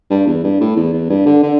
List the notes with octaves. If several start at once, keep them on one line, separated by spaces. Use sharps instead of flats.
G2
E2
G2
A2
E2
E2
G2
D3
D3